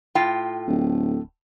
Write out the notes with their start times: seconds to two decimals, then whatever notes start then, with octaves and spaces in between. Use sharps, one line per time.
0.15 A2 F4 G5
0.67 D1